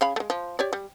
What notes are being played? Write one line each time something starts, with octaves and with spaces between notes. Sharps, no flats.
C#3 F5 B5
G#3 A3
F3
G4 C#5 D5
G3